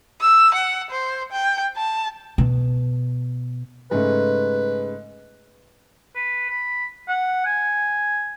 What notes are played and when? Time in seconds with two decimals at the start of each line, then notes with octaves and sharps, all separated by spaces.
0.21 E6
0.54 F#5
0.90 C5
1.32 G5
1.77 A5
2.38 B2
3.91 G#2 C#3 A3 B4
6.16 B4
6.50 B5
7.08 F#5
7.46 G#5